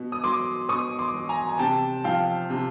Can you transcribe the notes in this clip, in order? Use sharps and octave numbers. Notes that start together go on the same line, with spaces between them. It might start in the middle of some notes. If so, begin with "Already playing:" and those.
Already playing: B2
D#6
F#3 C6 D6
B2 C#6 D#6
C6 D6
F#3
G#5 A#5
G#5
C3 G5 A5
F3 F5 G5
C3